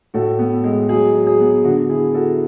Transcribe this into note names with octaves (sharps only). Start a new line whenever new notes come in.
A2 F#4 A4
B3
G#3
F#3 G#4
F#3
G#4
B3
D3 F#4
E4 G#4
E4 F#4 A4